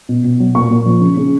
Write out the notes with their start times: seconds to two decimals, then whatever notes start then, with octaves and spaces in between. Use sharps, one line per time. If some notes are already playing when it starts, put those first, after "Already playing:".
0.09 B2
0.24 B2
0.40 F#3
0.55 A#2 C#6
0.71 A#2
0.86 F3
1.01 C#3
1.17 C#3